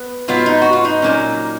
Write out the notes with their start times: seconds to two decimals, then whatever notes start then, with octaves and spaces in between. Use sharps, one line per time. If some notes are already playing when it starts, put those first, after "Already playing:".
Already playing: B3
0.28 G#2 F#3 B3 F4
0.46 D#4
0.62 F#4
0.73 F4
0.85 D#4
1.02 A#2 F#3 A#3 C#4